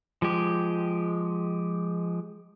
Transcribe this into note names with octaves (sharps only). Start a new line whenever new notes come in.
F3 G#3 G4